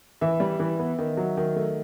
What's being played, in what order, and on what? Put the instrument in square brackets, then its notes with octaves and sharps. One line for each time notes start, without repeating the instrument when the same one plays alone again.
[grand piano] E3 E5
G3
E3
B3
D#3
F#3
D#3
A3